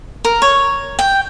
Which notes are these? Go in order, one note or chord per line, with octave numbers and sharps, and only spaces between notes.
A#4
C#5
G5